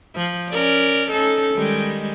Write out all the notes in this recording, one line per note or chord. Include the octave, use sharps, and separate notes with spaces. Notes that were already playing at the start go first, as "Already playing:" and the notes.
F3
C#4 A#4 D5
C#4 D#4 A4
D#3 G3 G#3